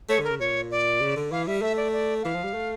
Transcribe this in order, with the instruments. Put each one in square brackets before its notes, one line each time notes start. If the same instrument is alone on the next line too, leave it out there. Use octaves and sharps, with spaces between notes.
[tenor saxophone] A3 [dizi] C#5
[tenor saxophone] D3 [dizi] A#4
[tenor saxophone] C#3
[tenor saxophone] A#2 [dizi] C#5
[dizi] D5
[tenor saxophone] C#3
D3
[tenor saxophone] E3 [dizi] F5
[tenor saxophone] G3 [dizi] E5
[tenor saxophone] A3 [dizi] E5
[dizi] D5
D5
[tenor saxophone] E3 [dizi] F5
[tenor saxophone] F3
G3
A3